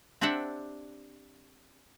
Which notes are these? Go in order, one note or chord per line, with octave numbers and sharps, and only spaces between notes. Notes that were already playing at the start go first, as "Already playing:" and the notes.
C4 D4 G4 D5 E5 F#5